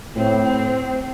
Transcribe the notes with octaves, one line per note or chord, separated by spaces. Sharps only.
A2 C4